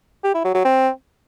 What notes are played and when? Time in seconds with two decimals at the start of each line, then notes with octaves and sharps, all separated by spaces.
0.24 G4
0.34 E4
0.44 F#3
0.55 F#3
0.65 C4